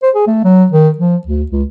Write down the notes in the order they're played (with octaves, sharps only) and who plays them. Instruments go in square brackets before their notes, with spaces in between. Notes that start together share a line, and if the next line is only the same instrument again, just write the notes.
[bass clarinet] C5
G#4
A3
F#3
D#3
F3
D2
C#2